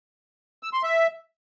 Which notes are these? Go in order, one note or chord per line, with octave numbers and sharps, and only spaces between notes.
E6
C6
E5